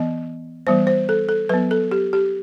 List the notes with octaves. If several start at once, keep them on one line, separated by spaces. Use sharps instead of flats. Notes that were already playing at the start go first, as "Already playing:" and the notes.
Already playing: E3 B3 D#5
E3 G3 B3 C5
C5
A4
A4
F#3 B3 B4
A4
G4
G4